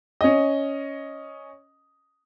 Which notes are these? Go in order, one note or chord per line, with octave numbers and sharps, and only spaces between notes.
C#4 D#5